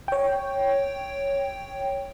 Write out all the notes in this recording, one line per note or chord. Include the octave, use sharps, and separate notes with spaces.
C#5 G5